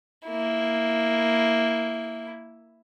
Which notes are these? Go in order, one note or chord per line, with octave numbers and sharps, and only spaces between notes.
A#3 E4